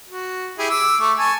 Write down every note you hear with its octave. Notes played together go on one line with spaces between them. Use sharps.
F#4
E4 G4 G#4
D6 E6
A3 C#6
G#5 A5 C#6